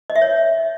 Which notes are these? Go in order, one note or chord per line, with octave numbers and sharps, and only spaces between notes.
D#5
E5
C#5